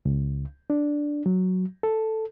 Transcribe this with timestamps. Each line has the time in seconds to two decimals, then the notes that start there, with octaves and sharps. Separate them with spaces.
0.05 C#2
0.70 D4
1.26 F#3
1.83 A4